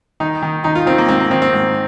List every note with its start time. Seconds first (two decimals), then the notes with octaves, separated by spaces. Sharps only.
0.20 D#3 D#4
0.43 D#3
0.64 D#3 D#4
0.75 F4
0.86 D#3 C4
0.98 A#3
1.08 G#2 C4
1.20 A#3
1.31 D#3 C4
1.42 C4
1.53 G#2